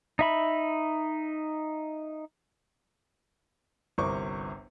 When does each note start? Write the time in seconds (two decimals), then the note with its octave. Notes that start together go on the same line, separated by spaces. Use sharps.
0.19 D#4 E5 B5
3.98 G1 C2 A#4 C5 C#6 D6